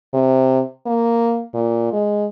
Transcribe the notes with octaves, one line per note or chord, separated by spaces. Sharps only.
C3
A#3
A#2
G#3